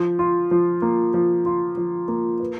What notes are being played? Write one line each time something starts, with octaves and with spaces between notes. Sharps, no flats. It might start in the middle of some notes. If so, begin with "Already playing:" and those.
Already playing: F3
F4
F3
A#3
F3
F4
F3
A#3
B4